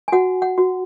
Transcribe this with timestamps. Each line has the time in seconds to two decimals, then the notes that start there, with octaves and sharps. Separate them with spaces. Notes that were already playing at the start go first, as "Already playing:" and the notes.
0.08 G#5
0.12 F#4 F#5
0.42 F#5
0.58 F#4